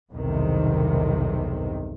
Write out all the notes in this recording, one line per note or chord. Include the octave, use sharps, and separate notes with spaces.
B1 E2 G2 C3 D#3